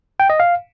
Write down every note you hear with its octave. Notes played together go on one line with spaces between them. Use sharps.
G5
D#5
F5